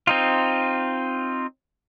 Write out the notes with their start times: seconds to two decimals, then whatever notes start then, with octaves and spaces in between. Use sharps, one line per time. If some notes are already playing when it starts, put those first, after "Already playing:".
0.07 C4 D#4 F4